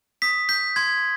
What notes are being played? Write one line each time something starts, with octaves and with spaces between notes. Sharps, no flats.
D#6 B6
G6 B6
C6 G#6